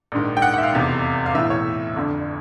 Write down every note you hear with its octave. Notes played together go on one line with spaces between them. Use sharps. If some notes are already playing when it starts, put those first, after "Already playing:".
A#1 G#2 D#3
G5
F#5
F#5
E5
F5
F1 E2 C3
F5
B1 A2 E3 E5
C#5
G1 F2 D3